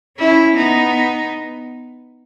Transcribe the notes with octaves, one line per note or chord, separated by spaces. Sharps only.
C#4 E4
B3 D#4